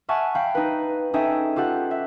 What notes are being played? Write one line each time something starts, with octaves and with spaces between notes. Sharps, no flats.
E5 F#5 G#5 A5 C#6 F6
F5 G5 B5 G6
D#4 B4
C#4 D#4 G#4 A4 E5 G5
F4 G4 A4 F#5
E5